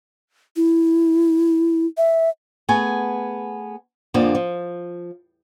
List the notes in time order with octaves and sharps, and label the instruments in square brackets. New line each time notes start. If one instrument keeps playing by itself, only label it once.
[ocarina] E4
E5
[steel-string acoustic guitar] A3 B3 G#4 G#5
F2 D3 F3 A#3 D4
F3